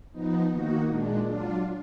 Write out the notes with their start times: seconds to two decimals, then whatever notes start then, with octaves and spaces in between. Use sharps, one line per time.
0.12 F3 B3 D#4
0.50 D#3 A#3 D#4 F#4
0.87 A#2 G#3 D4
1.24 F#3 D4 F4